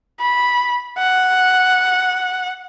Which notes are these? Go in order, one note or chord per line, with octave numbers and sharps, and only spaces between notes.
B5
F#5